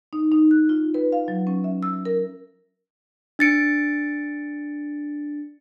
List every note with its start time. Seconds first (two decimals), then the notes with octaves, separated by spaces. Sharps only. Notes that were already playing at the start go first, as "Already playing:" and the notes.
0.13 D#4
0.32 D#4
0.51 F#6
0.69 F4
0.94 B4
1.12 F5
1.28 F#3
1.47 C#4
1.64 E5
1.83 E6
2.05 A#4
3.39 D4 A6 C#7 D7